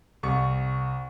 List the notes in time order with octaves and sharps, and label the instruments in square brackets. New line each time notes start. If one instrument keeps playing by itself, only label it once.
[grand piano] C2 C#6